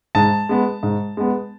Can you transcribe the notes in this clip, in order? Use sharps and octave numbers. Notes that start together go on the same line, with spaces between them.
G#2 A5
G#3 B3
G#2
G#3 B3